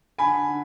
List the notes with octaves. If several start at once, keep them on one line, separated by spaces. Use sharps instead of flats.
D3 G#5 B5
D3